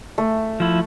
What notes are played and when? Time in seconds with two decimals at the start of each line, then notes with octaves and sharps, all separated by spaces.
0.18 A3
0.60 F3 E4